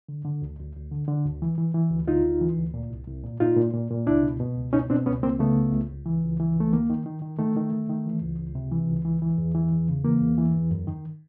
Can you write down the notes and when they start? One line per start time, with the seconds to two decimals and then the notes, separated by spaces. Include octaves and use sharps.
0.09 D3
0.25 D3
0.42 D2
0.59 D2
0.76 D2
0.91 D3
1.08 D3
1.25 D2
1.42 E3
1.58 E3
1.74 E3
1.91 D2
2.08 D2 D#4 F4
2.24 D2
2.41 E3
2.58 D2
2.74 A#2
2.90 C2
3.07 C2
3.24 A#2
3.40 A#2 D#4 F4
3.57 A#2
3.73 A#2
3.91 A#2
4.07 C#2 D4 E4
4.23 B2
4.40 B2
4.57 C#2
4.73 B2 C#4 D#4
4.90 B2 C4 D4
5.06 C#2 B3 C#4
5.23 C#2 A#3 C4
5.39 C#3 A3 B3
5.56 C#2
5.72 C#2
5.89 C#2
6.06 E3
6.23 C#2
6.40 E3
6.55 C#2 A3
6.72 D#3 A#3
6.90 D#3
7.06 D#3
7.22 D#3
7.39 D#3 A3
7.56 D#3
7.73 D#3
7.89 D#3
8.06 E3
8.22 C#2
8.39 C#2
8.55 C3
8.71 E3
8.89 C#2
9.05 E3
9.22 E3
9.38 E2
9.54 E3
9.72 E2
9.88 C#3
10.04 E3 A#3
10.21 E2
10.38 E3
10.55 E2
10.71 F#2
10.87 D#3